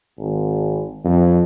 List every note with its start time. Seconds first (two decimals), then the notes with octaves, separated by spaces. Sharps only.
0.18 G#1
1.05 F2